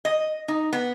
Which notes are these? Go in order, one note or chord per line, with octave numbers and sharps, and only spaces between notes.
D#5
D#4
B3